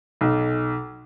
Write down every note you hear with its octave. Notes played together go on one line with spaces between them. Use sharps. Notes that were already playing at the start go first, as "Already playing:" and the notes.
B1